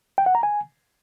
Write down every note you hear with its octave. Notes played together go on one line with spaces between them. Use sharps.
G5
F#5
A#5
G#5